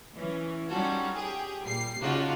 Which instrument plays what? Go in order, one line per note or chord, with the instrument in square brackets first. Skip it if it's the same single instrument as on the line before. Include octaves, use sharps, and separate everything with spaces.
[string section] E3 C#4
G3 C#4 D#4 F4 F#4 A4
G4 G#4
A#2 G3 C7
C#3 D4 D#4 F4 F#4